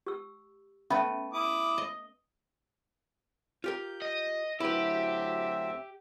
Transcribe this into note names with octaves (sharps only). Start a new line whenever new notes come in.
G4 E6
A3 B3 C#4 E5 B5
E4 D6 D#6
D#5
F4 G4 A#4 G6
D#5
D2 F#3 C4 E4 G4 B4 E5